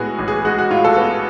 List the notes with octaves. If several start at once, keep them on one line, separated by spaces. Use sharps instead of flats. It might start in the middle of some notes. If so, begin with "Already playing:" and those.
Already playing: A2 G#3 B3 F#4 G#4
A1
G#4
G#3 F#4
F#4
A2 F4
A4
B3 F#4